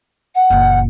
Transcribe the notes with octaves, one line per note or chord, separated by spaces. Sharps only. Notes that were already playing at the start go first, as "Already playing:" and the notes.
F#5
F#1 A#2